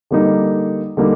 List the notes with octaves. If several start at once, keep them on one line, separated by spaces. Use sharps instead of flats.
D3 G3 A#3 D#4
D3 G3 A#3 D#4